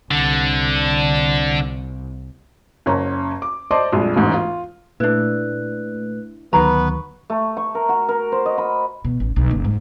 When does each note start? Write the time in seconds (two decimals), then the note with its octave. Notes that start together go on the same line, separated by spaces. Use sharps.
0.11 C2 D3
2.86 F#1 C#4 A#5
3.42 D6
3.71 C5 D5 D#5 A5 C6 D6
3.92 A#1 F2 G3 G#3
4.16 E1 A1 G#2
4.33 F4
5.00 A#2 A3 D4 E4 B4 F#6
6.53 D2 D#3 F#3 B3 B4 A#5 C#6
7.30 A3
7.57 C#6
7.75 A#4
7.89 F#4
8.09 A#4
8.32 C5
8.46 D#5
8.58 B5
9.05 B2
9.20 A1
9.36 B1
9.51 F#1
9.65 G#2